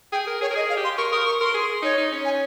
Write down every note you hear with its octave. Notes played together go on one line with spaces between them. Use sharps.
G#4 G5
A#4
G#4 C#5
A#4
G#4 D#5
F5
G4
C6
A#4 C#6
A#4 D#6
C#6
A#4 C6
G#4
D#4 C#5
D#4
C#4
G#5